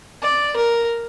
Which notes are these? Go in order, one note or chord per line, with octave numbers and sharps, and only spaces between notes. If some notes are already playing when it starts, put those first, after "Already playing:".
D5
A#4